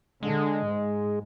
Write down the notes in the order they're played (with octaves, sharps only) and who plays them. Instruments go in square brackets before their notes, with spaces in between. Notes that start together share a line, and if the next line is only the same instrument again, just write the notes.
[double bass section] D3 [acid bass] G#3
[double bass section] G#2